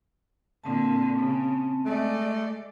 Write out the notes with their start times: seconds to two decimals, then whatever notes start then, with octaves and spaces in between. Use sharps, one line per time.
0.64 A#2 D3 C4 A5
1.18 C#3
1.85 G#3 A3 D5